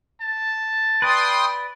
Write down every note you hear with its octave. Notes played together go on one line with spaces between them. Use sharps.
A5
B4 D5 G5 C6 D#6